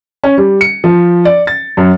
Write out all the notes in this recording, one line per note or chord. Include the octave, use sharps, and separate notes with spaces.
C#4
G3
C#7
F3
D5
A6
F#2